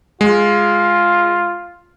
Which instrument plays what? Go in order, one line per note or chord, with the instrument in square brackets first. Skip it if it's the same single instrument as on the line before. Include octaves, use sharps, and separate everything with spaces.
[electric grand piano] G#3 [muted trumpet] F4